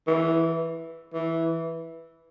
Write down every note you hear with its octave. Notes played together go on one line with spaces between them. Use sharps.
E3
E3